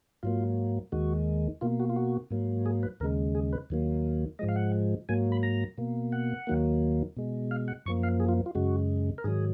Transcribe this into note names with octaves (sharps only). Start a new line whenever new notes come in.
G#2 F#3 A#3 F4
D#2 D#3 G#3 F#4
B2 A#3 F4
F#4
F4
F#4
G#2 F#3 A#3
G#4
B4
D#2 C#3 G#3 A#4
G#4
B4
D#2 D#3 F#3 A#3
G#2 F3 G#3 D#5
F5
F#5
G#2 F#3 A#3 G#5
B5
A#5
B2 A#3
F#5
D#2 D#3 F#3 A#3
B2 G#3
F5
F#5
F#2 F3 A#3 C#6
F5
G#4
F4
F4
F#2 C#3 G#3 F#4
A#4
G#2 D#3 F#3 G#4